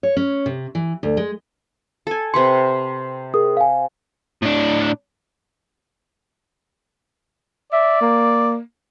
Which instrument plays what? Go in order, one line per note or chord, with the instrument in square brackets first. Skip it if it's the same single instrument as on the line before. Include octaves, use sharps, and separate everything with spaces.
[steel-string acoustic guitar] C#5
C#4
C3
E3
D2
G#3
[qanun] A4 G#5
[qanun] C3 B4 F#5 [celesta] C6
[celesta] G#4 A#4 D#6
F5 G#5
[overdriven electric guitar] A2 D4
[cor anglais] D5 [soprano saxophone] E5
[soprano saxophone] A#3